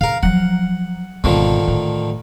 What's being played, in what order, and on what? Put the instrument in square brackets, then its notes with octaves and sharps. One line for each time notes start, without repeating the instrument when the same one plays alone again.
[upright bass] C#3 [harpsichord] A#4 F5
[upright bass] F3 F#3 [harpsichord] F#5
[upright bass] G#1 B2 [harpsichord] D3 D#3 F3
[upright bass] A2